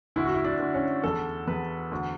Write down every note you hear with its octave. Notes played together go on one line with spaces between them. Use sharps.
D2 E4
F#4
E4
D4
D2
C#4
E2 A4
E2 B4
D2